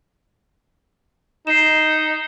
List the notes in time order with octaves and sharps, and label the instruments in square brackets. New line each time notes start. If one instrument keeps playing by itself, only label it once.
[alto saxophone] D#4 [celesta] C7 E7